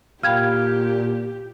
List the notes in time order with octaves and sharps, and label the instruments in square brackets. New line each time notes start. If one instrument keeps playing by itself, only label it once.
[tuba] A#2 [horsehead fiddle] G4 [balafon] F5 G5 B5 [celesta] F6 G#6